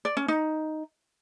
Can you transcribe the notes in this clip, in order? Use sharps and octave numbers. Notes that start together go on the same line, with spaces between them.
D5
C#4
D#4